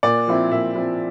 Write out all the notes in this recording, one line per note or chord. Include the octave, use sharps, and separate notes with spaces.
A#2 D5
F3 C4 E4
A#2 E5
F3 C4 E4